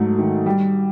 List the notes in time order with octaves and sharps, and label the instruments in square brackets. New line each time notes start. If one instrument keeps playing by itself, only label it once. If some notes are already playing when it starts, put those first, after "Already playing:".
Already playing: [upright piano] G#2 F#3 A3
D#3
G3